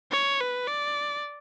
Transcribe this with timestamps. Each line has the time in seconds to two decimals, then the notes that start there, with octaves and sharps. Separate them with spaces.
0.12 C#5
0.40 B4
0.68 D5